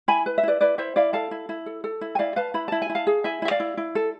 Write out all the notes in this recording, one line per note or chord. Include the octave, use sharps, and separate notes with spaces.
E4 G#5 B5
B4
E5
E4 B4 D5
E4 B4 D5
E4 C5 E5
E4 D5 F5
A4 F5 A5
E4
E4
A4
A4
E4
G#5
E4 D5 F5
B4 F5 A5
E4 B5
E4 A5
G#5
E4
F5 A5
G#4
E4 E5 G#5
E4 E5
D5 F5
E4
E4
A4